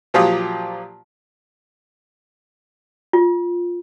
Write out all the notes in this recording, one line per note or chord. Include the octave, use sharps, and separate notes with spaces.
A#2 F3 F#3 F4 G4 D#6
F4